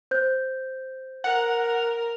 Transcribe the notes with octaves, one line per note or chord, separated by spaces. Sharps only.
C5 G6
A#4 F#5